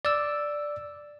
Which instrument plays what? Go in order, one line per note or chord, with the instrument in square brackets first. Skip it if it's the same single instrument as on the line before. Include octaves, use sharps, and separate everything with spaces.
[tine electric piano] D5 E6